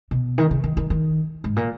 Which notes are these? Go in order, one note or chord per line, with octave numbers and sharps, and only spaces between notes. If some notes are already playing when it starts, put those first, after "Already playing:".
B2
D#3
C#3
D#3
D#3
D#3
G#2
A#2